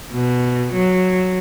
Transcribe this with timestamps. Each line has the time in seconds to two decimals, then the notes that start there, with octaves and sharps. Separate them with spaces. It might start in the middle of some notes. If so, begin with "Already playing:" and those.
0.12 B2
0.73 F#3